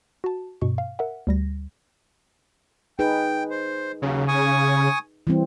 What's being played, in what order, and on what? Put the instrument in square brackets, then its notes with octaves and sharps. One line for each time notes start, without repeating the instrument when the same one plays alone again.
[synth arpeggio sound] F#4 A5
G2 B2 C#6
F5
A#4 E5 F#5
D2 G3 A#6
[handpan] D#4 G#4 B4 [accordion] G5
[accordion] C5
[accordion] D#2 F#3 [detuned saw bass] C#3
[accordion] G#5 C#6 D#6
[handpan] E3 G3 C4